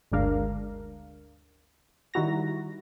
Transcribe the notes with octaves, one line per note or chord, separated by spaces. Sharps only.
G1 D2 G#3 D4 A#4 F5
D#3 G3 E4 F#4 A#5 A#6